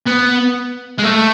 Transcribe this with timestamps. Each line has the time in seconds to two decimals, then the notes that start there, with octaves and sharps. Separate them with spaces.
0.06 B3
0.98 G#3
1.03 A3